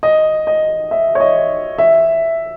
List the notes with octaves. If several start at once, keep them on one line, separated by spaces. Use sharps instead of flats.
D#5
D#5
E5
C#5
D#5
E5